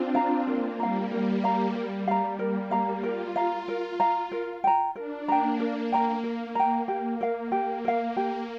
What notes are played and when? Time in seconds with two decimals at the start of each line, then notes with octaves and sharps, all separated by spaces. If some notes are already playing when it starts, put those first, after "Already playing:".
Already playing: C4 D4 F4
0.15 C4 F5 A#5
0.47 A#3 A#4
0.79 G3 F5 A#5
1.11 A#4
1.44 F5 A#5
1.75 A#4
2.07 F5 A#5
2.39 A#3 A#4
2.71 F5 A#5
3.03 F4 A#4
3.36 F5 A#5
3.68 A#4
4.00 F5 A#5
4.32 A#4
4.64 G5 A#5
4.95 D4 A#4
5.28 A#3 G5 A#5
5.60 A#4
5.92 G5 A#5
6.23 A#3 A#4
6.55 G5 A#5
6.88 G4
7.21 A#4 F5
7.52 G4
7.85 A#4 F5
8.16 A#3 G4